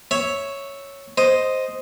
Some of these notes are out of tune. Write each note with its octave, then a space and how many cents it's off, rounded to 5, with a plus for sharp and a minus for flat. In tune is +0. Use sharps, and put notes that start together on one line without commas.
C#5 +0 E5 -5
C5 +0 D#5 +0